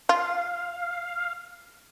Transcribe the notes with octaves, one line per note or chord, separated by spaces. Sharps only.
F4 F5